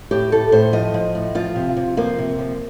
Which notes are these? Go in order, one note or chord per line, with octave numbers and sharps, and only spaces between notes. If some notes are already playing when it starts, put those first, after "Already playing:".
A2 G4
A2 A4
A2 C5
F3 D#5
F3
A2
F3 F4
C3
C3
F3 A#3
C3
F3